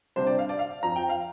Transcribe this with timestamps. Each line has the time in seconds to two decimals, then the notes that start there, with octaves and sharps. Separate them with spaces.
0.16 C3 G3 D4 C5
0.27 D5
0.39 F5
0.49 D5
0.59 F5
0.83 F2 F3 C4 A#5
0.96 G5
1.09 F5